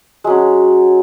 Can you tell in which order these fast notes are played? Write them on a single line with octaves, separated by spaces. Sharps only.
G#3 F#3 C#4